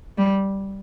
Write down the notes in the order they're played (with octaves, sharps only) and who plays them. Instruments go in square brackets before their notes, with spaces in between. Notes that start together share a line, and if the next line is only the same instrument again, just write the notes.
[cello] G3